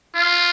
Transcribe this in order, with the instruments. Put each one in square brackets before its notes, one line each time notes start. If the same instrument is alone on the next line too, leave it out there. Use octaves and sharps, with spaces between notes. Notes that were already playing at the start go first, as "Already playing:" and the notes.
[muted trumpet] F4